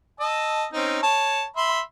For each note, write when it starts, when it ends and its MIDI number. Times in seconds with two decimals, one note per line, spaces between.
0.20 0.65 75
0.20 0.65 81
0.20 0.65 88
0.73 1.00 60
0.73 1.00 61
0.73 1.00 63
1.03 1.45 73
1.03 1.45 81
1.56 1.81 76
1.56 1.81 83
1.56 1.81 84